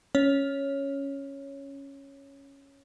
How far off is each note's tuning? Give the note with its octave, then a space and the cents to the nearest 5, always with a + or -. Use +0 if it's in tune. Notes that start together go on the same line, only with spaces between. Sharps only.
C#4 +0 C#5 +0